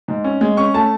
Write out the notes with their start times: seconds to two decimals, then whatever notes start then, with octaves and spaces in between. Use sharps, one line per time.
0.08 G#2
0.24 C#4
0.41 G#3
0.57 C#4 C#6
0.74 A3 A5